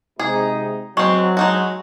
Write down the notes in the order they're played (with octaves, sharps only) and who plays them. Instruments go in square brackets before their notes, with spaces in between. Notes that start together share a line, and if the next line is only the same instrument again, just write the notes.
[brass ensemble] C3 G#3 D#4 [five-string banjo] G#4
[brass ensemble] F#3 [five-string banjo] G#3 C4 [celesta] C#6
[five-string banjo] G#3 D#4 F#4